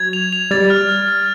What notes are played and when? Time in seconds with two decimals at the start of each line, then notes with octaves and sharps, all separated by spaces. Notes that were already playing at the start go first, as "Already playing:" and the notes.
Already playing: F#3 G#6
0.13 F7
0.33 F7
0.51 G3 A6
0.70 F6
0.89 F6
1.08 F6